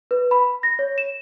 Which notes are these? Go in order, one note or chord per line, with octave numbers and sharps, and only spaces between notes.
B4
B5
A#6
C#5
E7